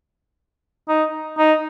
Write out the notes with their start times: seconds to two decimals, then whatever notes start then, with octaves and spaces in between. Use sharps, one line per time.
0.88 D#4
1.38 D#4